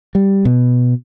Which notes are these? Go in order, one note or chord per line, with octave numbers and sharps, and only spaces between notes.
G3
B2